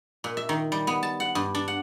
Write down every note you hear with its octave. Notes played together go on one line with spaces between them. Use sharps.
A#2
E5
D#3
G3
B3
A5
F#5
G2
D4
F#5